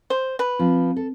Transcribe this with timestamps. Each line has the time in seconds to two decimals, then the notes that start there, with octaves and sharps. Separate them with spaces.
0.10 C5
0.39 B4
0.59 F3 C4
0.96 A4